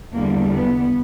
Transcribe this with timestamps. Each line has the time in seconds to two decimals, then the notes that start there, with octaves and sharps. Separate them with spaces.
0.13 E2 D3 G3 A#3
0.55 B3